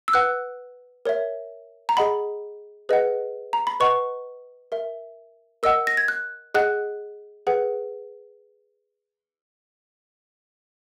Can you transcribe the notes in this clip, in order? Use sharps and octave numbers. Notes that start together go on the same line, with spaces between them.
E6
B4 F#5 F#6
A#4 C#5 E5
A#5
G#4 D#5 F#5 B5
G#4 B4 D#5 F#5
A#5
B5
B4 D#5 F#5 C#6
A#4 E5
A#4 D#5 F#5 E6
A#6
G#6
F#6
G#4 D#5 F#5 F#6
G#4 B4 F#5